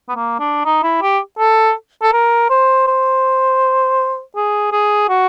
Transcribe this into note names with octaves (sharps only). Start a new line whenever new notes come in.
B3
A#3
D4
D#4
E4
G4
A4
A4
A#4
C5
C5
G#4
G#4
F#4